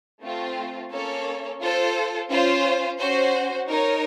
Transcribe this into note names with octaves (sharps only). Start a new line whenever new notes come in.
A3 C4 F4
A#3 C#4 A4 C#5
F4 A4 C5
C#4 F4 C5
C#4 F#4 C5
D#4 A#4 C#5